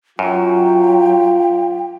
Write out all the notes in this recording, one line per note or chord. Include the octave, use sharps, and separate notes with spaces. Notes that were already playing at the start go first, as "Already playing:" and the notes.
F#2 F#3 F4 G5